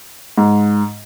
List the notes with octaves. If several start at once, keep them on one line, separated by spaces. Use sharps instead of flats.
G#2